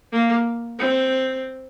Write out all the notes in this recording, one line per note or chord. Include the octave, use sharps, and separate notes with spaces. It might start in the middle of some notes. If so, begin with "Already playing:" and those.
A#3
C4